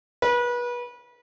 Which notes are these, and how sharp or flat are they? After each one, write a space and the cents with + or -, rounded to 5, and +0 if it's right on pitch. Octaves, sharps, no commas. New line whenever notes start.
B4 -30